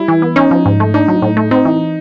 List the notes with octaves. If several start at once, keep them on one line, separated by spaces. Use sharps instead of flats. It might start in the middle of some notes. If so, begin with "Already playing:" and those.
Already playing: G3 E4
E3
B3
C#4 D#4
F3
G#2
A3
D4 D#4
F#3
A2
A3
C4 D#4
E3